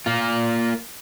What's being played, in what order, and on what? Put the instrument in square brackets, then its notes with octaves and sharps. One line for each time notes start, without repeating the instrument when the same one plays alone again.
[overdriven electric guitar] A#3 F4